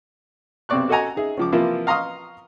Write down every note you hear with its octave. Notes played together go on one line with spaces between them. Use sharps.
B1 C3 C4 D5 C#6 F#6
F#4 A4 D#5 F#5 G#5 A#5
D#4 G#4 E5
C#2 F3 D6
C3 E3 F3 A#3 E4 F4
F5 A#5 C6 C#6 D#6 F6